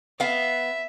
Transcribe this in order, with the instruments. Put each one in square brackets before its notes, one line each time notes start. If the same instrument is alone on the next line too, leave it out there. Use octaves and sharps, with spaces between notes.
[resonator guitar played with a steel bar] B3 F5 [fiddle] E5